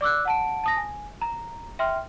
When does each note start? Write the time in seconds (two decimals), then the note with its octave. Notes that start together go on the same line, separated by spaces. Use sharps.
0.01 D5 D6 E6 F#6
0.25 F#5 A5 D7
0.64 A5 D#6 A#6
0.76 G#5
1.21 A#5
1.79 E5 G5 C6 F6